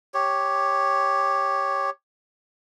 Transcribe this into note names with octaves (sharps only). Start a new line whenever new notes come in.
G4 C#5